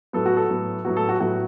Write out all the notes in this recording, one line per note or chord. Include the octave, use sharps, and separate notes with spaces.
A2 F#3 B3 A4
F#4
A4
A2 F#3 B3
A2 F#3 B3 F#4
A4
F#4
A2 F#3 B3 F#4